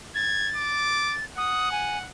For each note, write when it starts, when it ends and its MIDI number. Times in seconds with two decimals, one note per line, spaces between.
0.15 0.50 92
0.15 1.25 93
0.55 1.16 86
1.38 2.09 78
1.38 1.72 87
1.72 1.98 80